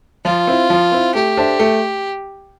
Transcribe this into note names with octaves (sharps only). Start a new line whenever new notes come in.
F3 F4
C4 E4
F3
C4 E4
A3 G4
D4 A4 C5 E5
A3